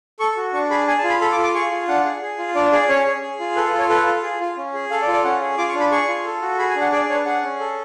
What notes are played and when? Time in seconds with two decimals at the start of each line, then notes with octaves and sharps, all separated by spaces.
0.20 A4 C#6
0.37 F#4
0.53 D4 C#6
0.71 G#4 B5
0.87 G#4 G#5
0.98 A5
1.04 F4
1.10 B5
1.21 A4 B5
1.32 D6
1.38 F4
1.43 D6
1.54 G#4 C#6
1.71 F4
1.88 D4 F#5
2.05 G#4
2.22 G#4
2.38 F4
2.55 D4 D5
2.72 G#4 D5
2.89 C#4 C#5
3.06 G#4
3.22 G#4
3.40 F4
3.56 A4 B4
3.68 B4
3.73 F4
3.79 C#5
3.90 A4 B4
4.07 F4
4.23 G#4
4.40 F4
4.57 C#4
4.74 G#4
4.91 A4 F5
5.02 D5
5.07 F4
5.13 D5
5.24 C#4 F#5
5.41 G#4
5.58 F4 D6
5.69 C#6
5.75 D4
5.80 B5
5.91 G#4 C#6
6.08 F4
6.25 A4
6.42 F#4
6.59 G#4 B5
6.70 G#5
6.76 D4
6.81 F#5
6.92 G#4 D5
7.09 D4 C#5
7.15 B4
7.26 G#4 F#5
7.43 C#4
7.60 A4